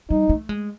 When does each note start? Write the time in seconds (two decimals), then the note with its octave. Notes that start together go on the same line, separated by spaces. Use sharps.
0.10 G3 D#4
0.29 A3
0.49 G#3